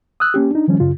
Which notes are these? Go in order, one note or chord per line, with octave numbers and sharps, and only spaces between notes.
D#6 E6 F#6
A#3 C#4 G4
D4 D#4
D#3 F3 G3 C#4
F#2 C#3 F4